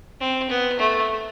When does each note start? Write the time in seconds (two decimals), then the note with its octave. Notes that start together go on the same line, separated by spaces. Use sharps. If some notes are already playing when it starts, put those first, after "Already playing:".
0.20 C4
0.50 B3
0.79 A3